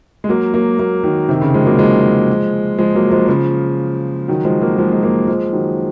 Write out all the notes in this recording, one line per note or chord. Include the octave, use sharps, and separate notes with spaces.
G#3
F#3 A#3
F#3 A#3
F#3 A#3
D#3 F#3
C3 D#3
C#3
F3 G#3
F#3 A#3
F3 G#3
F3 G#3
F#3 A#3
F3 G#3
C#3 F3
D#3 F#3
F3 G#3
F#3 A#3
F3 G#3
G#3
F#3 A#3
F3 G#3
D#3 F#3